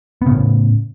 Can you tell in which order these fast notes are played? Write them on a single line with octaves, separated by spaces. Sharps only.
B3 C#3 A2